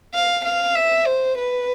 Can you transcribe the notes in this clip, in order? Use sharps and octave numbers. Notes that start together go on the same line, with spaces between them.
F5
F5
E5
C5
B4